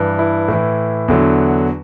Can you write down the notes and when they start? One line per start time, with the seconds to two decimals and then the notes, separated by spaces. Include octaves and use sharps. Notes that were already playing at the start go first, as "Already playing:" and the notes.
Already playing: G2 E3
0.19 E4
0.48 A2 E3
1.08 E2 D3 F#3